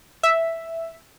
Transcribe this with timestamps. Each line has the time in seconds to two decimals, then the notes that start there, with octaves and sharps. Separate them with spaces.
0.23 E5